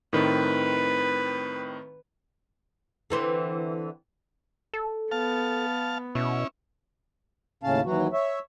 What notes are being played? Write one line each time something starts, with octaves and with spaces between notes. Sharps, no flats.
A2 D#3 C4 B4
D3 E3 C4
A4
B3 F5 A5
B2 C#4 E4
D#2 A2 C#3 C#4 F5 A5
D#2 E3 F#3 F#4
C#5 E5